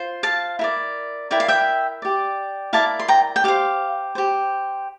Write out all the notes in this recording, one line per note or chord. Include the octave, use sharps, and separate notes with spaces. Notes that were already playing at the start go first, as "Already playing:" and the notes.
Already playing: F4 C5
F5 A5
E4 A#4 D5
E4 A#4 D5 G5
F5
E5 G5
G4 D5
E4 A#4 D5 F5 A5
C6
G5 A#5
G5
G4 C5 F5
G4 C5